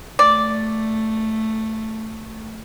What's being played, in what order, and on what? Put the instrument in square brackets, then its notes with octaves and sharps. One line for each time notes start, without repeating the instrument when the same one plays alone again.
[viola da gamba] A3 [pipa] D5